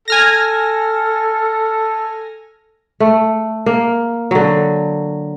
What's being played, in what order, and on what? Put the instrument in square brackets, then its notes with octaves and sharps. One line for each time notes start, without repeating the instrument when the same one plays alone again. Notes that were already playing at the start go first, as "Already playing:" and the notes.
[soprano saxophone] A4 [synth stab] G#5 F6 A#6
[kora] A3
A#3
D3 F#3